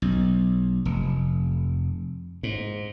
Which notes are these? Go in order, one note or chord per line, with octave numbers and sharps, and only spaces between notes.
B1
F1
G#2